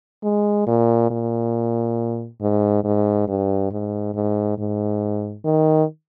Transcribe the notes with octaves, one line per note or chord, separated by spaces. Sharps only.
G#3
A#2
A#2
G#2
G#2
G2
G#2
G#2
G#2
D#3